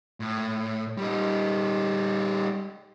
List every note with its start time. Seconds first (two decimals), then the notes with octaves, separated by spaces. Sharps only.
0.20 A2
0.98 G3 D#4